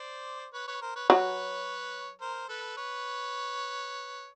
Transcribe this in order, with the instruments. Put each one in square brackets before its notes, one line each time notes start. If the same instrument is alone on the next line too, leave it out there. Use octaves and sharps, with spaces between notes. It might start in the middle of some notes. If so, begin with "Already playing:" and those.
Already playing: [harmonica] C5 D5
B4 C#5
B4 C#5
A#4 C5
B4 C#5
[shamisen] F#3 [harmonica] B4 C#5
[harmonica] A#4 C5
A4 B4
B4 C#5